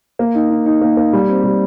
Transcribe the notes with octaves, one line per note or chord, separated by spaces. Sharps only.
A#3
D#4
D#4
D#4
A#3
A#3
G3
C4
G3